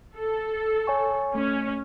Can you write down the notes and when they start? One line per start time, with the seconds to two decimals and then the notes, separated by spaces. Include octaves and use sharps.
0.16 A4
0.87 C#5 G#5 C#6
1.35 A3 C#4